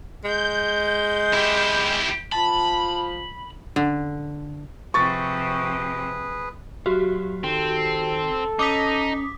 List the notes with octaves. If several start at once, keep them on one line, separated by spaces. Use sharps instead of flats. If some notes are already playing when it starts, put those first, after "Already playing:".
G#3 G6
E4 G4
F3 A5 B5
D3
C3 F3 G#4 B4 C#6 A6
F#3 F#4 G4
D#3 C4 A4
C#4 D#4 D6 D#6 B6